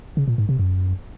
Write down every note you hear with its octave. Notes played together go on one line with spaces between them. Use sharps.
C#3
A#2
G#2
C3
F#2